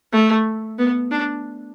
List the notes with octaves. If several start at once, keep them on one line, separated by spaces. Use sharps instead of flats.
A3
B3
D4